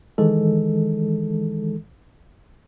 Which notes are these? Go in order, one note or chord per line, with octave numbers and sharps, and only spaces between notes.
D#3 E3 G#3 A4